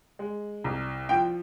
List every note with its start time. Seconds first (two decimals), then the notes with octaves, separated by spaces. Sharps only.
0.19 G#3
0.64 C2
1.09 F3 G5